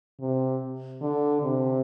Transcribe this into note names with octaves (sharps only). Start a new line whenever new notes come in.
C3
D3
C3